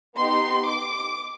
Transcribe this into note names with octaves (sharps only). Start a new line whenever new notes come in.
B3 D#4 G4 C6
D6